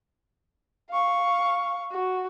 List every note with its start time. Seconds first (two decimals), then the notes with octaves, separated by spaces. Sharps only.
0.90 F5 C#6
1.91 F#4